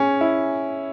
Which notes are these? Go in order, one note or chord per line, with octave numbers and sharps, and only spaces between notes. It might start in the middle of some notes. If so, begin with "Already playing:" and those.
Already playing: C#4 G#4
E4